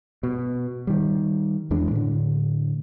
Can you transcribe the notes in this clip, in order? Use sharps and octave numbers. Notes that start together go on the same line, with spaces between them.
B2
D#3 G3
E2 E3 G#3 D4
A2 D3